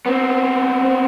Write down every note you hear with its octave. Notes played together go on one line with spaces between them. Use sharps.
B3 C4